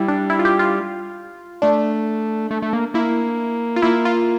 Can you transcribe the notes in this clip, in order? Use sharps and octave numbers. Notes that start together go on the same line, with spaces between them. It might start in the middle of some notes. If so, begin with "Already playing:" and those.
Already playing: G3 E4
D4
E4
F4
G4
F4
A3 D4
A3
A3
A#3
A#3 E4
F4
A#3 E4
F4